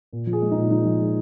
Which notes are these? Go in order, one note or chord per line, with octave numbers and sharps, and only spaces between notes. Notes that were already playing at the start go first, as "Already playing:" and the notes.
A#2
F3
G#4
G#3
D#4
A#2
F3 D#4
F3
G#3